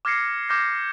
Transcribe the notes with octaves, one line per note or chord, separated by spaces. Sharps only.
D6 F6 G#6 A#6 C7 C#7
D6 F6 G6 G#6 A#6